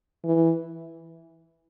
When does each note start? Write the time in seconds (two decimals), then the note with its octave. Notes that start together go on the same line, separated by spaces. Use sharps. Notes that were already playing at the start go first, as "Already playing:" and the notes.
0.25 E3